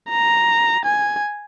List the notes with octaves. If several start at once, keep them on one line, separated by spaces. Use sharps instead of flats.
A#5
G#5